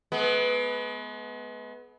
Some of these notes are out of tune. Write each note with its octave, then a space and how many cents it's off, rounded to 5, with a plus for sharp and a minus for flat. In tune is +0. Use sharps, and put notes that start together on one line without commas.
G#3 +40 B3 +0